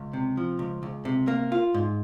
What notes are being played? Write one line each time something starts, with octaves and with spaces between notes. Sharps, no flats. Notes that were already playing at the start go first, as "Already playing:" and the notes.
Already playing: C#2
C3
F3
C#2
C#2
C3
A#3
F4
G#2